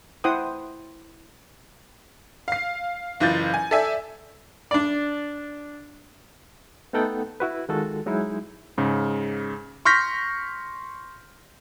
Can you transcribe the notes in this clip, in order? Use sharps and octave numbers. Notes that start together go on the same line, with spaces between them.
E4 C5 F#5 G5 D#6
F5 C7
F#1 E3 F4 G6 A6
G#5
A4 D5 E5 G#5
D4 D5
A3 B3 D#4 A4 F#5 G5
E4 F#4 B4
D#3 G#3 F4 F#4 A4
F#3 G#3 D#4 E4
G#2 C#3
C6 C#6 F6 G6 A#6 B6